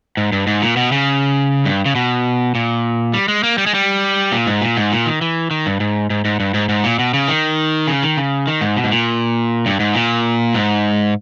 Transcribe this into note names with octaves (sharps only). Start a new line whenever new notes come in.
G#2
G2
G#2
A#2
B2
C#3
G2
C#3
B2
A#2
G3
G#3
A#3
G3
G#3
G3
A#2
G#2
A#2
G#2
A#2
D#3
E3
D#3
G2
G#2
G#2
G#2
G2
G#2
G#2
A#2
B2
C#3
D#3
C#3
D#3
C#3
D#3
G#2
B2
G#2
A#2
G2
G#2
A#2
G#2